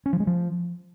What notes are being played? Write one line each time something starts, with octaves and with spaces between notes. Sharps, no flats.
C#4
F3
G#3
F3